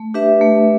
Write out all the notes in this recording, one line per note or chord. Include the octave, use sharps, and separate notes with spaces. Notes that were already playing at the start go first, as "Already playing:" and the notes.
Already playing: A3
D4 G4 B4 E5
A3